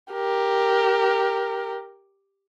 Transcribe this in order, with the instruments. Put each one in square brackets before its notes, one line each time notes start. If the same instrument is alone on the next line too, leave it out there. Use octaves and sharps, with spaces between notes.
[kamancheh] G4 A#4